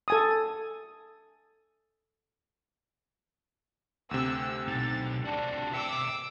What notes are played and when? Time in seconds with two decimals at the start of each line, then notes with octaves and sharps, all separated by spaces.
0.08 A4 G#5 D#6
4.11 D2 C3 E6
4.68 B1 D#4 A6
5.25 D4 F4 F#4
5.73 E5 G5 D6 E6